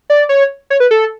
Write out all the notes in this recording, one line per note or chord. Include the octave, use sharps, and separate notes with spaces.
D5
C#5
C#5
B4
A4